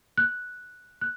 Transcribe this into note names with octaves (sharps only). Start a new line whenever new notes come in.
F#6
F#6